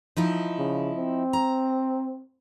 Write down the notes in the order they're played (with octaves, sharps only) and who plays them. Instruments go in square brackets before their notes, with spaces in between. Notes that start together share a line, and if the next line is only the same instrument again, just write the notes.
[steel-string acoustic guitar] F3 D#4 E4
[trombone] C#3
C4
[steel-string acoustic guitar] A#5